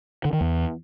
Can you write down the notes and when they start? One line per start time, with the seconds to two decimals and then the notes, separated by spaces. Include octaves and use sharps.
0.25 D3
0.33 D#3
0.41 E2